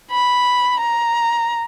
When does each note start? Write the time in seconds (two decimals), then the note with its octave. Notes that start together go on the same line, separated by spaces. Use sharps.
0.11 B5
0.80 A#5